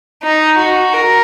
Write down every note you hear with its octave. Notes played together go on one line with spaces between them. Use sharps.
D#4
F#4
A#4